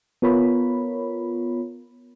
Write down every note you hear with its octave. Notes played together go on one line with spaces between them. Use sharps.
B3 F4 A#4 C#5 B5